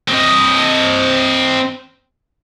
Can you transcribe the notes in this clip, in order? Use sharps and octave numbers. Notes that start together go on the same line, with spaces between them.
C4 D#5